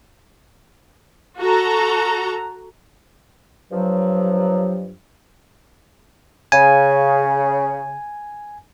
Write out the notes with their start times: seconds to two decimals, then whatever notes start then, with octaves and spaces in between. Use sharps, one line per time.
1.39 F#4 A4 A#5
3.72 G2 F3 F#3
6.52 C#3 G#5